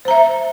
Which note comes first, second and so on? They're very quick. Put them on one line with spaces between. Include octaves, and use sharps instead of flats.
C5 A#5 E5